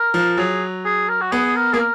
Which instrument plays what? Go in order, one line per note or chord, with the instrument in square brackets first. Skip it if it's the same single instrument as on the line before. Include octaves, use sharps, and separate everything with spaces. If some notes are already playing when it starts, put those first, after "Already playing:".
Already playing: [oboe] A#4
[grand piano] F3
[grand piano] F#3 [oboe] G#4
[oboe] G#4
A#4
F#4
[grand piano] B3 [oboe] G#4
[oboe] A#4
[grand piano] A#3 [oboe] G#4
[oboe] A#4